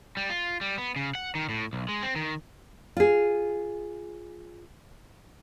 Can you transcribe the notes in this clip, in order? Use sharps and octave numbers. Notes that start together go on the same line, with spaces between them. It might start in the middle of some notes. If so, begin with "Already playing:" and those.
G3
F4
G3
B3
C#3
F#5
D#3
A2
B1
G#3
C4
D#3
F4 G#4